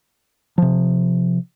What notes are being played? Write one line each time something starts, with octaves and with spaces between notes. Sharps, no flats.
C3 F3